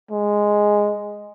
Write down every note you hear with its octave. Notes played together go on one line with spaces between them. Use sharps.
G#3